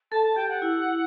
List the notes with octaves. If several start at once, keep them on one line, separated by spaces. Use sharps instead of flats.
A4 A5
A5
G4 G5
F#5
E4